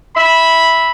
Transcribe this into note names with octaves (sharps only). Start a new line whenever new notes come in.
E5 B5